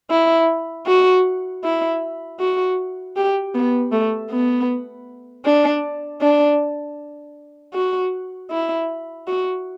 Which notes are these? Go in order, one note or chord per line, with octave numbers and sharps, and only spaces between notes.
E4
F#4
E4
F#4
G4
B3
A3
B3
D4
D4
F#4
E4
F#4